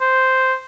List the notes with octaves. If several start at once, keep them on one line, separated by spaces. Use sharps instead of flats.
C5